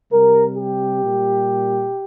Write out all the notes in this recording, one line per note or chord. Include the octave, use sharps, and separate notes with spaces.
C3 G3 A#4
G4
A#2 G3